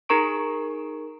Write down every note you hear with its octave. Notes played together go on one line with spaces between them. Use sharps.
D#4 G#4 A#4 A#5 C#6 D7